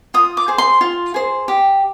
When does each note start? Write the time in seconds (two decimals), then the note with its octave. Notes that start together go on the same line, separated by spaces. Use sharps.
0.14 F4 D#6
0.37 D6
0.48 G#4 C5
0.58 C6
0.81 F4
1.14 G#4 C5
1.48 G4